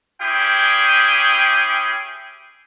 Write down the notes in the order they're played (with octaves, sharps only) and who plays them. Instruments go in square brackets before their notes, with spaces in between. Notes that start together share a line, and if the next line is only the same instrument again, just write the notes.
[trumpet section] C#4 E4 G4 G#4 G5